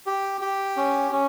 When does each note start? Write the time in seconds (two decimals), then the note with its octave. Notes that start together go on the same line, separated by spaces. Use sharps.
0.07 G4
0.41 G4
0.77 C#4
1.12 C#4